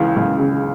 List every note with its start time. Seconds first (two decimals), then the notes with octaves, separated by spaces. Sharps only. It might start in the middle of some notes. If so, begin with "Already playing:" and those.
Already playing: C#2 C#3 E3
0.16 C#2
0.39 C#3